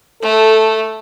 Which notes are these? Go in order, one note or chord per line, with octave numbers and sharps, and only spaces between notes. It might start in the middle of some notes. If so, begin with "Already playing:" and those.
A3 A4